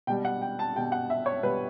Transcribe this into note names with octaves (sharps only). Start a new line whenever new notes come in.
B2 G3 G5
F#5
G5
A5
B2 G3 G5
F#5
E5
C#5
B2 G3 B4